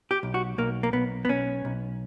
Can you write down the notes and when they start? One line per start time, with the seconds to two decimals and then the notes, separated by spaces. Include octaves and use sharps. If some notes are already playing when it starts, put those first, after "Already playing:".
0.11 G4
0.23 B1
0.34 F#4
0.58 B1 A#3
0.83 A#3
0.93 B1 B3
1.25 B3
1.29 B1 C#4
1.65 B1